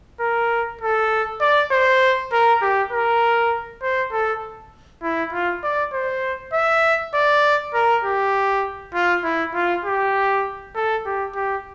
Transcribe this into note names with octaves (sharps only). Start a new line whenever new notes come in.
A#4
A4
D5
C5
A#4
G4
A#4
C5
A4
E4
F4
D5
C5
E5
D5
A#4
G4
F4
E4
F4
G4
A4
G4
G4